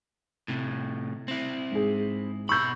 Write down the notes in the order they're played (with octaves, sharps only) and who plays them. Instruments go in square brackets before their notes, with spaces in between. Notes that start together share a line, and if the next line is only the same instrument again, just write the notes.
[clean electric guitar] A2 C3
C4 E4
[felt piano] G#2 G#4
[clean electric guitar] B2 B5 [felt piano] C#6 E6 G6